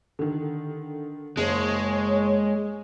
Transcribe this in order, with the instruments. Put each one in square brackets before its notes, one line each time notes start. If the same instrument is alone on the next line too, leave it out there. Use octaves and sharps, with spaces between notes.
[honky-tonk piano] D3 D#3
[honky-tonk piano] F#1 [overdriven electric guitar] G#3 [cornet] C#5